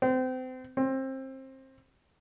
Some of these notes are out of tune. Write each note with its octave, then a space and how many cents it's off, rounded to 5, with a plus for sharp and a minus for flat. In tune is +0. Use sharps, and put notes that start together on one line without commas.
C4 -30
C4 +25